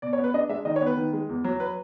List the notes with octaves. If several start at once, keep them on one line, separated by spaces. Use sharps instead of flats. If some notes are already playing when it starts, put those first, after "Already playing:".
B2 D5
C#5
B3
B4
D4 D#5
G#3 E5
D#3 D#5
C#5
B3 B4
D#3
G#3
E2
F#3
B4